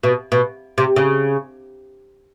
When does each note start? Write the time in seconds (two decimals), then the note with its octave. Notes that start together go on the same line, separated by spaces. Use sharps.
0.03 B2
0.32 B2
0.78 C3
0.96 C#3